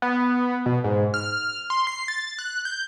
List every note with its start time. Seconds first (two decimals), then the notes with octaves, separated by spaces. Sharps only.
0.02 B3
0.66 B2
0.84 G#2
1.14 F6
1.70 C6
1.87 C7
2.08 A6
2.39 F#6
2.65 G6